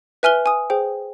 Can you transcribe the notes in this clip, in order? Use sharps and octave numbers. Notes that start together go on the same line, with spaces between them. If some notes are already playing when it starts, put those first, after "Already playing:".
B4 E5 G#5 F6 F#6 G7
G#5 D#6
G#4 C5 G5